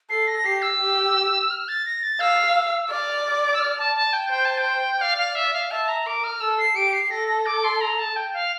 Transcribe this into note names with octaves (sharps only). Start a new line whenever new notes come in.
A4 C7
A#6
G4 C7
E6
G4
F6
A6
A#6
A6
F5 E6
E6
D5 F6
D6
E6
F6
A5
A5
G5
C5 G5
A5
G5
D5 F5
F5
E5
F5
E5 A5
A#5
A#4 D6
F6
A4 E6
C7
G4 D7
C7
A4 A#6
A#6
D6
C6
A#5
A5
G5
F5